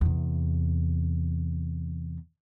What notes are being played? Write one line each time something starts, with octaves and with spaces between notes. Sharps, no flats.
E2 C3